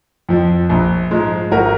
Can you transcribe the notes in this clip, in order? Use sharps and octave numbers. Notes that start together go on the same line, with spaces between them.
F2 F3
A#1
G#2 F3 G#3
G#1 F#4 A#4